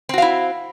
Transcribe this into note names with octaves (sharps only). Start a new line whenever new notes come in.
C4 E4 F#4 F5